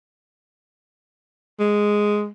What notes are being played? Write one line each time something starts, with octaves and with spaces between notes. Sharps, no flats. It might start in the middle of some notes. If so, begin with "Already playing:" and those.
G#3